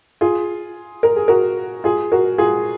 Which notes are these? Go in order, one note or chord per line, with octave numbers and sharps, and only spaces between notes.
F4 G#4
A#4
G#4
F#4 A#4
F4 G#4
F#4 A#4
F4 G#4